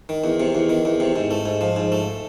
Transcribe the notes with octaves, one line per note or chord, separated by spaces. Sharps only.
D#3
E2
C3
E2
D#3
E2
C3
G#2
A3
G#2
F3
G#2
A3